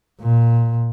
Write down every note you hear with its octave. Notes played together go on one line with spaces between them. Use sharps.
A#2